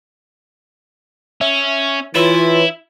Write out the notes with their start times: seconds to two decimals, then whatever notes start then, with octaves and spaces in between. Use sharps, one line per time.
1.41 C#4 E5
2.15 E3 E4 F4 B4 C#5 E6